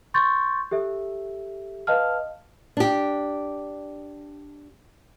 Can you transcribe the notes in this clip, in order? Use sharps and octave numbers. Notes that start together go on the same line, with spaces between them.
C6 C#6 G6 A6
G4 A4 E5
B4 D#5 F5 A5 F6
D4 G4